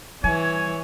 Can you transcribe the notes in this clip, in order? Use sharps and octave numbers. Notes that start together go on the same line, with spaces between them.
E3 G3 C#5 G#5